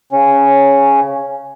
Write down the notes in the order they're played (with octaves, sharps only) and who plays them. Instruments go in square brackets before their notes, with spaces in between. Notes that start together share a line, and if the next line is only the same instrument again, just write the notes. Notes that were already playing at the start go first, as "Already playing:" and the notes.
[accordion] C#3 C#4